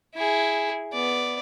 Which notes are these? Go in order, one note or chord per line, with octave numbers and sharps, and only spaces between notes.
E4 G#4
B3 D5